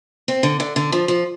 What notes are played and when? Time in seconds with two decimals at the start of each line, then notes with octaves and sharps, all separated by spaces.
0.28 C4
0.43 D3
0.60 D3
0.76 D3
0.92 F3
1.08 F3